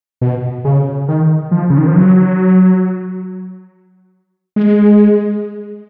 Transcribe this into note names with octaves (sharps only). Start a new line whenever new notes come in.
B2
C#3
D#3
F3
C#3
D#3
F3
F#3
G#3